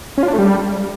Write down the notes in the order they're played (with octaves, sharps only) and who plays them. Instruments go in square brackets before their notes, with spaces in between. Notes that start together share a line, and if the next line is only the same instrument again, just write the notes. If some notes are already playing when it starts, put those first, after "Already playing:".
[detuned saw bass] C#4
F4
D4
A3
G3